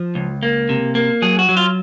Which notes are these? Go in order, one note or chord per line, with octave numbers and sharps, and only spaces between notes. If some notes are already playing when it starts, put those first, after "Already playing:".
Already playing: F3
C#2
A#3
C3
A#3
F#3 G#4
F#4
F#3
F4